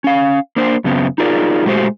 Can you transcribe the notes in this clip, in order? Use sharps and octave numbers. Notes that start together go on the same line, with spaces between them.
C#4 F5
A#3 D4 C5
F#2 C#3 B3 C4
D#4 F4 G#4 A#4 D5
A#2 G#3 A3 F#4 G4 C5